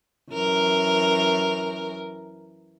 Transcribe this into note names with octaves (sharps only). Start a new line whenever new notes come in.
F#2 E3 A#4